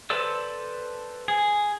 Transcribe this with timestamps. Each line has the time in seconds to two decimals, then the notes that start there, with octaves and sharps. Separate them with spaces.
0.10 A4 B4 C5 D5 E6
1.28 G#4